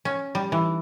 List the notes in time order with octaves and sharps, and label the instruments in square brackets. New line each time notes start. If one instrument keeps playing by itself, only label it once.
[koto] C#4
G3
E3